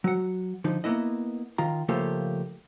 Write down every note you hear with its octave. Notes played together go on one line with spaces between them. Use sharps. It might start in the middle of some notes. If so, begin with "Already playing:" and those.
F#3 F#5
D3 F3 D#4
A#3 B3 E4 D#5
D#3 F4 A#5
C#3 F3 A3 A#3 F4 G4